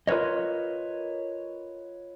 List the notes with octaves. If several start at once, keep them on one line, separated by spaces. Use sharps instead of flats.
F4 A#4 B4 C#5 D#5